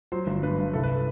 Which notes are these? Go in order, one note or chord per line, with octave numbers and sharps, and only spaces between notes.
F#3 C5
G1
G2 B4
G2
C2 A4
B4
A4